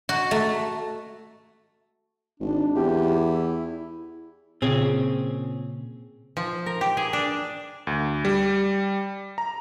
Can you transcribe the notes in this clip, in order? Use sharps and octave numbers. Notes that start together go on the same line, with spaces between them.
F#4
A3
G#1 D4
E2 G4
E4
A#2 C#3 C4 C#4 G#4
F3
A#4
G4
G#4
D4
D2
G3
A#5